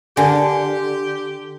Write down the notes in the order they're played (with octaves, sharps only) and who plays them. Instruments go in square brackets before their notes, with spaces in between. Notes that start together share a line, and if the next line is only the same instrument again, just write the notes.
[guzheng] D3 [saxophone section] G4 [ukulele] A#4 G#5 A5